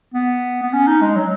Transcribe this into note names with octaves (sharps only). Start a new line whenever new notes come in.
B3
B3
C#4
D#4
G#3
F#3